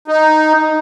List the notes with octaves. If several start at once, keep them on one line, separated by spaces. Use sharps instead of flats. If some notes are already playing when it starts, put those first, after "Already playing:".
D#4